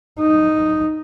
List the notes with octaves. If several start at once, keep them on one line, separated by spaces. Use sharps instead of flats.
D#4